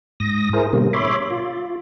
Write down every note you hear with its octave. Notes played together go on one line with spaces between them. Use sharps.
G#2 D#6 A#6
E4 G#4 A#4 C5
B2 D3 G3 A#3
C#5 E5 B5 C6 D6
F4